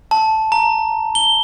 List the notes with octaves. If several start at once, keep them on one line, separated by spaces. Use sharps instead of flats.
A5
A#5
G7